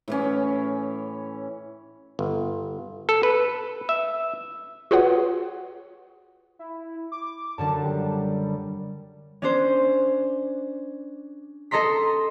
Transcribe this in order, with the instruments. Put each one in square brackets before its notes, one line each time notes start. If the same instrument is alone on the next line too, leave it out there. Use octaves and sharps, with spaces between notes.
[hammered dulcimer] A2 E3 C#4
[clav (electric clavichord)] G1
A4
B4
E5
[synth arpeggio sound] F4 F#4 G#4 B4 C#5 F#5
[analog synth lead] E4
D6
[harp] F#2 D3 D4 [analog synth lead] A5
[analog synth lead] G3
[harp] C#4 D4 C5
A4 D#5 A#5 C6 B6